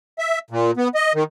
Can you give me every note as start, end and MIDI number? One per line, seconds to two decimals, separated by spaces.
0.19 0.39 76
0.51 0.71 46
0.77 0.88 59
0.95 1.13 75
1.14 1.24 51